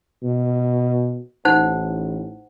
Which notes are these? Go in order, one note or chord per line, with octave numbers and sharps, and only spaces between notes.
B2
A1 D#4 C5 F#5